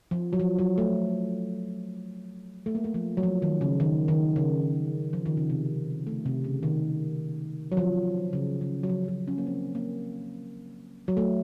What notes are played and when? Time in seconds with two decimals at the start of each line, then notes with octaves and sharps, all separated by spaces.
0.11 F3
0.33 F#3
0.39 F3
0.58 F#3
0.78 A3
2.66 A3
2.75 A#3
2.84 A3
2.94 F3
3.17 F#3
3.23 F3
3.42 D#3
3.61 C#3
3.80 D#3
4.08 D#3
4.36 C#3
5.13 F3
5.26 D#3
5.37 C#3
5.50 C3
6.07 A3
6.26 C3
6.44 C#3
6.63 D#3
7.72 F#3
7.77 F3
8.33 C#3
8.61 C#3
8.83 F#3
8.89 F3
9.04 F3
9.08 F#3
9.27 C#4
9.38 A#3
9.47 C4
9.75 A#3
11.08 F#3
11.17 A3